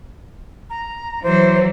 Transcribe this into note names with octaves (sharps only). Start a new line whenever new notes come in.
A#5
E3 F#3 C5